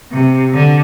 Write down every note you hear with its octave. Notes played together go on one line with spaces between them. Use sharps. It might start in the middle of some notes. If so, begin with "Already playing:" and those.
C3
D3